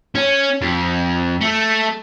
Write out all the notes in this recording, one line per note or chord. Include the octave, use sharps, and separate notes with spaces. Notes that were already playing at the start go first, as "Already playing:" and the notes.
C#4
F2
A3